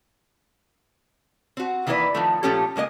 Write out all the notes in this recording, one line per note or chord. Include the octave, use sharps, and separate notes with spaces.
C4 F#4
D#3 E3 A#3 E4 B4 D5
D#3 F3 A3
A#2 F3 A3 C#4 G4 A4
C#3 G#3 A#3 D#5